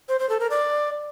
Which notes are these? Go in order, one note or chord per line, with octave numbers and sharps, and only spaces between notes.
C5
C5
A4
A#4
D5